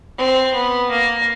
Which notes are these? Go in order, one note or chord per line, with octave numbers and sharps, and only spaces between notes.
C4
B3
A#3